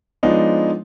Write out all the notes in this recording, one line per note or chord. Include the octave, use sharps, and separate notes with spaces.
F3 G#3 B3 D4 D#4 C#5